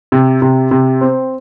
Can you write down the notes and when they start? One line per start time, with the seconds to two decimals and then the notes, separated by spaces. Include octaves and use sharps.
0.12 C3
0.42 C3
0.71 C3
1.01 C4